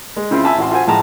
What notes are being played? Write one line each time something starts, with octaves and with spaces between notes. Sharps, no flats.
G#3
C#3 C4 E4 F4
E5 G#5 A5 B5
A1 F#4 C6
F4 F#4 C5 G#5
A2 F3 G#3 A5 A#5